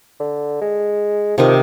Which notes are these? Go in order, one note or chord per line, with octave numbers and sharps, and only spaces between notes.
D3
G#3
C3 D#3 F3 D#5